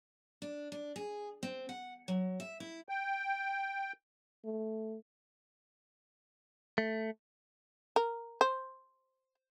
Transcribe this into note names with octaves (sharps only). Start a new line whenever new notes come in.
D4
D4
G#4
C4
F#5
F#3
E5
E4
G5
A3
A3
A#4
C5